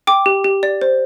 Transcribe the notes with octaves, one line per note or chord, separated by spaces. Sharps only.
G5 D6
G4
G4
D5
C5